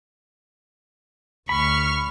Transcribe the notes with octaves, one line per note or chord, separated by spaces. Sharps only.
D2 B5 C#6 F6